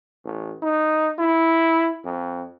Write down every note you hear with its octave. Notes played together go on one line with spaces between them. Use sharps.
A1
D#4
E4
F2